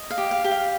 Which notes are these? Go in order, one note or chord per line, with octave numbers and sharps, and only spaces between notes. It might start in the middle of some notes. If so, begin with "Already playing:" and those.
Already playing: D#5
F5
G4
F5
G4
F5